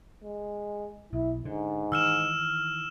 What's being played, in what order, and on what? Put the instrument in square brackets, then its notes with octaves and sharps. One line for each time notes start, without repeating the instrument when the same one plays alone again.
[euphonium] G#3
[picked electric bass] B1 [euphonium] E4
[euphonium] G#2 [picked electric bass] D3
[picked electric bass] D#3 E3 [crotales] E6 F6 E7